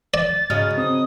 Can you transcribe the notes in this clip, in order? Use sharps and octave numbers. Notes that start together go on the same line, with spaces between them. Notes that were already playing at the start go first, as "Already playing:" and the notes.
D5 A6
G#2 C#3 F#3 D#5 F6
C4 D#6